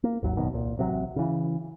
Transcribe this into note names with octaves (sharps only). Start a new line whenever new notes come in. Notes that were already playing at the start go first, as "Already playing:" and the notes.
A#3
G#1 D#2 F#3
D1 F#2 B2 D#3
C2 A#2
A1 C3 F#3
C#3 E3